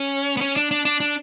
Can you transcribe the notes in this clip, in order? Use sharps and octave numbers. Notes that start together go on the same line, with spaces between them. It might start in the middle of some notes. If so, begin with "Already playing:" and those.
Already playing: C#4
B3
C#4
D4
D4
D4
D4